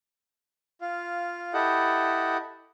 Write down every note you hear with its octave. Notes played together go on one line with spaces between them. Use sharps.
F4 F5
E4 G4 A4 D#5 F#5